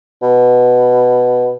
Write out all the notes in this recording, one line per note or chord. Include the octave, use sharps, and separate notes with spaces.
B2